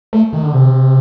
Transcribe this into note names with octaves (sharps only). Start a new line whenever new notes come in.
A3
D#3
D3
C3